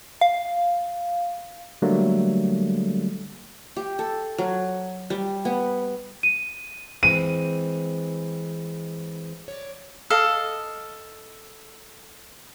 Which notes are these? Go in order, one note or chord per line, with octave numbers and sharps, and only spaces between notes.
F5
D3 F#3 G3 A3 A#3
G4
A4
F#3
G3
B3
D#7
E3 G#3 C4 D#7
C#5 D5
A4 D#5 F5